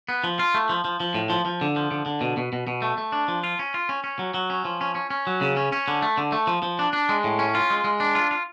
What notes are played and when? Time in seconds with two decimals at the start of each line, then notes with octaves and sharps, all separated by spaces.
0.09 B3
0.24 F3
0.39 F4
0.54 A3
0.69 F3
0.85 F3
1.00 F3
1.14 A2
1.30 F3
1.46 F3
1.61 D3
1.76 F3
1.91 D3
2.06 D3
2.21 B2
2.37 B2
2.53 B2
2.67 B2
2.82 A3
2.98 A3
3.12 D4
3.28 F3
3.44 F4
3.59 C#4
3.74 F4
3.89 C#4
4.04 C#4
4.19 F#3
4.34 F#3
4.50 C#4
4.65 F3
4.81 C#4
4.95 C#4
5.10 C#4
5.27 F#3
5.41 C#3
5.57 C#4
5.72 C#4
5.88 D3
6.02 A3
6.18 D3
6.32 A3
6.47 F3
6.63 F3
6.79 D4
6.93 D4
7.09 G#3
7.24 A2
7.39 C#4
7.55 F4
7.70 G#3
7.84 G#3
8.00 D4
8.15 F4
8.31 F4